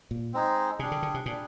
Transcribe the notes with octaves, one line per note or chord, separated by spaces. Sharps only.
A#2
G#3 C4 D#4 G#4
C3 G3 D4 G#4
D3
D3
C3
A#2 G3 D4 G#4